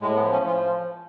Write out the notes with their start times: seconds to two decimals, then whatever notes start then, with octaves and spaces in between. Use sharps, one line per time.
0.01 A2 G#3
0.16 B3
0.21 F3
0.32 C#4
0.42 F3
0.47 F4